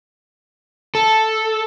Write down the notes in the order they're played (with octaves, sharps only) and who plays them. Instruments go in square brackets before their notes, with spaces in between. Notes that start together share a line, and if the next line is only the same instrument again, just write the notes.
[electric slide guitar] A4